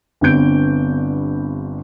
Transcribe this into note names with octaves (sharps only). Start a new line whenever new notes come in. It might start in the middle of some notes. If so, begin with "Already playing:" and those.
G1 G2 B3 C4 G6 D7